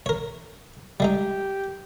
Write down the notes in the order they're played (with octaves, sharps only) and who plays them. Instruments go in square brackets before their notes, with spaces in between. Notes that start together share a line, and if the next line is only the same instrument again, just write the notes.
[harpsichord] A#4 C#5
[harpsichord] G3 G#3 D#4 [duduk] G4